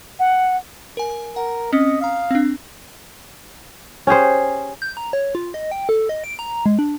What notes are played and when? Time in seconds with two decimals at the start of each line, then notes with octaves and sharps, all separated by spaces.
0.19 F#5
0.97 A#4 G#5
1.36 A#4 F#5
1.73 C4 C#4 D#5 C#7
2.01 F5 A#5 D#6
2.31 C4 D4
4.07 C#4 G4 G#4 C5
4.82 G6
4.97 A#5
5.13 C#5
5.35 F4
5.54 D#5
5.71 G5
5.89 A4
6.09 D#5
6.24 D7
6.39 A#5
6.66 G#3
6.79 D4